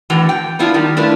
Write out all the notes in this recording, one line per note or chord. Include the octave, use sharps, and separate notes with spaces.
A2 D3 E3 F#4
G5
B3 D4 E4 F4
D#3 G3
A3 D4 E4 F4 B4